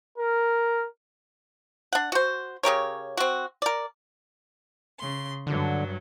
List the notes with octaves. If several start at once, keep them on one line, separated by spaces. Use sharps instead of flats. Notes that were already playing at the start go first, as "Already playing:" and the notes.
A#4
D4 F#5
F#4 C5
C#3 G4 A#4 C#5
C4 F#4
A#4 D5
C#3 C6
G2 D3 F#3